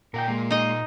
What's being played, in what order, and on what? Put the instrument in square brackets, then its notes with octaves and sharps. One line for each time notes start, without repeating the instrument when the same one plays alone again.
[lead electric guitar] A#2 [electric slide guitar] A#4 F#5 G5
[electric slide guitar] G#3 A#3
[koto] D#4 D#5